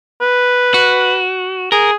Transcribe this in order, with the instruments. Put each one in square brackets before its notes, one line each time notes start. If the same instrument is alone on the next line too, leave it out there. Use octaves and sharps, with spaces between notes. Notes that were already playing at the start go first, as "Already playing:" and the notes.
[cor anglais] B4
[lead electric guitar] F#4
[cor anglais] G#4 [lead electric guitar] A#4